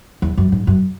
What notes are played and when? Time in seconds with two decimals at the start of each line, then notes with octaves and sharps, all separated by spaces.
0.22 E2
0.37 F#2
0.52 G#2
0.67 F#2